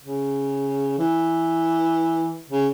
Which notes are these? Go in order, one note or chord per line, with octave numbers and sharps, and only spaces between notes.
C#3
E3
C#3